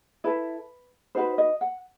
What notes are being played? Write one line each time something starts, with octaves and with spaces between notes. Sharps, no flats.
E4 A4 B4
D#4 F#4 B4 C5
D#5
F#5